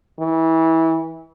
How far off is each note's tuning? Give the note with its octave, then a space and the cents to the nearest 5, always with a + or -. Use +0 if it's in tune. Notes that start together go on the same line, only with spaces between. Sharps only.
E3 -25